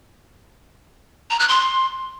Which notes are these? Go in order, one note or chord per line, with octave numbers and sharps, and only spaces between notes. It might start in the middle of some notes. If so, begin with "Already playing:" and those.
A#5
F#6
C6